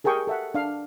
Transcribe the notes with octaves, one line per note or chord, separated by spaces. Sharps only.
G4 G#4 A#4 G5 C#6
A4 E5 F#5
D4 F5